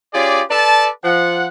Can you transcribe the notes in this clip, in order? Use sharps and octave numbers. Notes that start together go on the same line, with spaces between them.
C#4 F4 G4 G#4 D5
A4 B4 D5 A5
F3 F#5